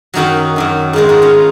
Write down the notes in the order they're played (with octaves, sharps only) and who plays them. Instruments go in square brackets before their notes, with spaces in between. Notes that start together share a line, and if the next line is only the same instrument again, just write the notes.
[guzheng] F#2 D#3 F#3 D#4 F#4
F#2 D#3 F#3
G#2 D#3 G#3 F4 G#4
D#4 F#4
C#4 F4